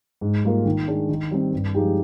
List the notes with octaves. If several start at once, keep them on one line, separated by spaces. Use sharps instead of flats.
G#2
G3 A#3 F4 A#4
D#3
G#3 D4
D#3
G3 C4
G2
F3 G#3 D#4 G4